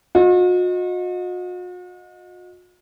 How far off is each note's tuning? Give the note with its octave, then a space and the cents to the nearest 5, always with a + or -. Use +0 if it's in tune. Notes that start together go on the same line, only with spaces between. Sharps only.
F#4 -45 D#5 +0